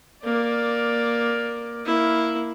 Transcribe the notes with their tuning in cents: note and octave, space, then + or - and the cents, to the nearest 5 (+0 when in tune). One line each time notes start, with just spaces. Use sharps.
A#3 +10 D5 +0
A#3 +0 E4 -5